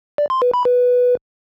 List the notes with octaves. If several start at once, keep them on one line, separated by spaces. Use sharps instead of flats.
D5
C6
B4
B5
B4